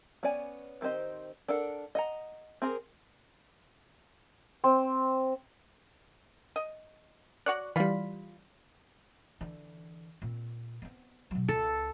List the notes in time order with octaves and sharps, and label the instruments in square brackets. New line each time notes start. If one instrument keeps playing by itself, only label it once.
[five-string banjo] B3 C#4 C#5 D5 G#5
D#3 C4 G4 C5 D#5
D4 A4 A#4 F#5
D#5 F#5 A#5
C4 G#4 A#4
[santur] C4
[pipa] D#5
[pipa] F#4 C#5 D5 [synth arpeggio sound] F#6
[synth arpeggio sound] E3 G3 [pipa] F4 B5
[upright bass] D3 E3
A#2 C4
B3 C4
B2 F#3
[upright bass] C#2 [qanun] A4